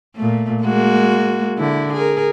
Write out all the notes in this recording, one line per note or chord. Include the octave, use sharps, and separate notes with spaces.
A#2 A3
G#3 A#3 F#4
D3 E4
G#4 A#4